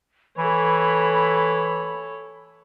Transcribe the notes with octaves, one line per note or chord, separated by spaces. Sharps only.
E3 A4 C#5 B5